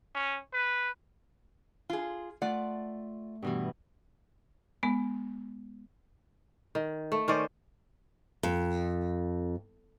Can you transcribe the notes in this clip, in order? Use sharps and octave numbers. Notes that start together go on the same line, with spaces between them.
C#4
B4
F4 G#4
A3 F4 D5 F#5
G2 B2 E3
G#3 B3
D#3
A3
D#3 C#4 C5 D5
F2